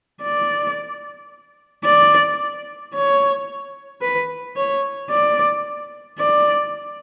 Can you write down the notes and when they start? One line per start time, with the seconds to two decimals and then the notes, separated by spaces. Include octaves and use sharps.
0.22 D5
1.84 D5
2.94 C#5
4.01 B4
4.57 C#5
5.11 D5
6.19 D5